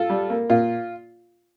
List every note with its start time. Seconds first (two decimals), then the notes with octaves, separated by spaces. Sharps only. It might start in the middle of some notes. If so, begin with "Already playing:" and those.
Already playing: F4 A4
0.10 G3
0.30 A#3
0.50 A#2 F4